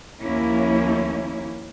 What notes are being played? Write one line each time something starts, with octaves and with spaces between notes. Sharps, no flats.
D#2 F3 A#3 C#4 E4